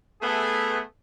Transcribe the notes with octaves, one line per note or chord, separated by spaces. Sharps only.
A3 B3 G#4